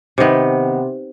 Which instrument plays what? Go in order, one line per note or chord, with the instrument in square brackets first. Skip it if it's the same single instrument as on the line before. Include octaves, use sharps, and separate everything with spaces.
[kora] C3 D#3 B3